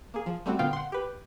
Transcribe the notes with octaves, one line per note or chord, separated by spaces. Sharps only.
A#3 G#4
F3
G3 A3 C4 F#4
A#2 D3 B3 F4 F5 G5
F#5 C6
G4 B4